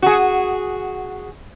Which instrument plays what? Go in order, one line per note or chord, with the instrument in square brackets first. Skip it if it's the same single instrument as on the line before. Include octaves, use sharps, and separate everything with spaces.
[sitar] F#4 G#4